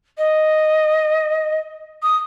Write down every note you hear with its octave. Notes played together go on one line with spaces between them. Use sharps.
D#5
D#6